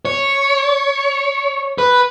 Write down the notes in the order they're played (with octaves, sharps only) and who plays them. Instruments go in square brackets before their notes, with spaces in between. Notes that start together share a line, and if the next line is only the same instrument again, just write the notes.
[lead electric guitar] C#5
B4